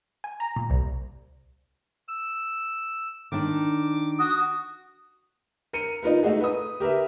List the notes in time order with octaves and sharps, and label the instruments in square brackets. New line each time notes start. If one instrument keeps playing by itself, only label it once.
[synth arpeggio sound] G#5
A#5
A#2
C2
[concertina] E6
[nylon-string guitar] D#3 D4 [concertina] D6
[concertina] F#4 [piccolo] D#6
[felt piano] A#4 C#7 D#7
D#4 F4 A#4 B4
A3 D#4 F#4 G#4
B4 D#6
G4 A#4 B4 E5